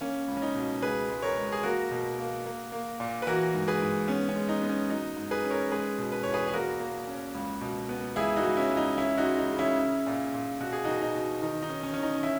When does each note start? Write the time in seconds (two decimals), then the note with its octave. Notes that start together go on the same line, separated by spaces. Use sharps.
0.01 A#3 C#4
0.28 C#2
0.37 C#4
0.42 D#4
0.55 B2
0.82 C#2 G#4 B4
1.10 G#3
1.22 A#4 C#5
1.37 G#3
1.52 G#4
1.63 A#3 F#4 A#4
1.91 B2
2.19 A#3
2.46 A#3
2.72 A#3
3.00 A#2
3.22 B4
3.27 E3 F#4 A#4
3.54 G#2
3.68 G#4 B4
3.82 G#2
4.08 B3 C#4
4.29 C#4
4.36 G#3
4.49 D#4
4.62 B3
4.69 C#4
4.90 F#3 D#4
5.17 G#2
5.31 G#4 B4
5.44 C#4
5.50 A#4 C#5
5.71 G#3 G#4 B4
5.98 B2
6.12 B4
6.23 E2 C#5
6.34 G#4 B4
6.48 G#4
6.53 A#3 F#4 A#4
6.80 A#3
7.07 C#4
7.35 C#2
7.61 B2
7.89 B3
8.16 C#2 E4 G#4
8.36 D#4 F#4
8.43 C#2
8.57 C#4 E4
8.71 C#2
8.77 D#4
8.98 C#4 E4
9.17 D#4 F#4
9.25 G#3
9.38 D#4
9.52 C#3
9.58 C#4 E4
9.79 C#4
10.07 A#2
10.34 A#2
10.60 B2 F#4
10.73 G#4
10.85 B2 D#4 F#4
11.02 D#4
11.16 B2
11.42 D#3 D#4
11.63 D#4
11.69 C#4
11.83 C#4
11.94 D#3 C#4
12.03 D#4
12.23 C#4 E4